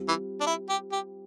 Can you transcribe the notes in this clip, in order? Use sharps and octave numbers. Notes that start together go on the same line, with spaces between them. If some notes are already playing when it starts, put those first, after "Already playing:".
Already playing: G3 C4 F4
E3
D4
E4
G4
G4